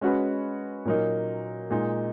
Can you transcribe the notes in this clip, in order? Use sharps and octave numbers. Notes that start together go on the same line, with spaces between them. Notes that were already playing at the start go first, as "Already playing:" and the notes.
G#3 C#4 F#4 B4
A#2 F#3 A#3 D#4
A#2 G#3 D#4